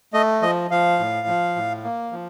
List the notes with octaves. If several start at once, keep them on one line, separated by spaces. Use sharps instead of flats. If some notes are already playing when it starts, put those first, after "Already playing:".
A3 D#5
F3 D#5
F3 F5
A2
F3
A2
A#3
F3